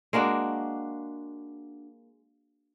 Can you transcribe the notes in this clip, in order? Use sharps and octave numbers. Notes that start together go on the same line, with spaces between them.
G#3 A#3 D4 F#4